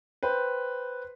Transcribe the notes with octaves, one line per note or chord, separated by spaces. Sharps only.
B4 C5 G5